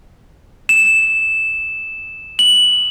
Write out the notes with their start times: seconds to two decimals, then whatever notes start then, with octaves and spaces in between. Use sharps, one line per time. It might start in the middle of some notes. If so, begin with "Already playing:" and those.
0.69 E7
2.39 F#7